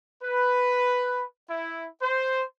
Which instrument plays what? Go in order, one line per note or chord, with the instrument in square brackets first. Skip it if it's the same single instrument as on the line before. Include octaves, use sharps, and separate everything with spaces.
[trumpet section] B4
E4
C5